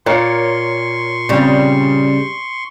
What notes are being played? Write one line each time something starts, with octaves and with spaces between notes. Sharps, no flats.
A#2 A#4 C#5 C6 C#6
C#3 G3 C4 D5